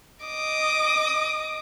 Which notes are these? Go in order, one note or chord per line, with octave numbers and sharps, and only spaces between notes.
D#5 D6 D#6